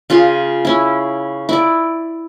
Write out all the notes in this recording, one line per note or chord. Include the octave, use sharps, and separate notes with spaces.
C#3 F4 G#4
C#4 E4
E4 D5